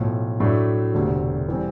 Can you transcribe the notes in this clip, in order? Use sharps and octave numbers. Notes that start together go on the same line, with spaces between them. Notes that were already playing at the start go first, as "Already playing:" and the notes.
Already playing: B1 A2 F3
A2 F#3 A3 D4
E1 D2 C3
E3 G3 C4